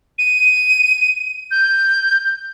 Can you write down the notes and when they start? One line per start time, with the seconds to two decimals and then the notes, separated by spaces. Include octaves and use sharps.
0.18 D#7
1.51 G6